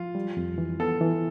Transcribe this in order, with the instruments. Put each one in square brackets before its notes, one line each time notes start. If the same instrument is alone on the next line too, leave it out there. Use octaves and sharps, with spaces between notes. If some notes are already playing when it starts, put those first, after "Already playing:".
Already playing: [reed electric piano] F3 [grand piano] F4
[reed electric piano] G3
F2
E3
[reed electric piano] B3 [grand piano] A4
[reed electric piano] E3